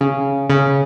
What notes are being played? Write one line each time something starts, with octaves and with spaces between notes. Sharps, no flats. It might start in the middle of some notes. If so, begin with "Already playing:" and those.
C#3
C#3